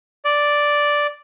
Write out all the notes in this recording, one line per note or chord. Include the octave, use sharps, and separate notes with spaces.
D5